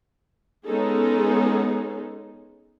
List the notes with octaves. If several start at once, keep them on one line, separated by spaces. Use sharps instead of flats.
G#3 B3 C#4 D#4 G#4 A4